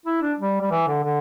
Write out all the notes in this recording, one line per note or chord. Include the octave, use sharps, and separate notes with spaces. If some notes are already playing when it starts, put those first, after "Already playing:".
E4
D4
G3
G3
E3
D3
D3